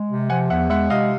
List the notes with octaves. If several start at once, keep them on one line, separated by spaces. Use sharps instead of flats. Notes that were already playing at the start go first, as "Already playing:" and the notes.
Already playing: G#3
C3
F3 F#5 G#5
E2 E5 F#5
G#3 E5 F#5
C3 D#5 F5